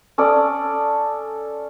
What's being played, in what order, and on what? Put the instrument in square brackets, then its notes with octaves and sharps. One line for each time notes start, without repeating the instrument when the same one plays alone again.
[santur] C#4 A4 D5 D#6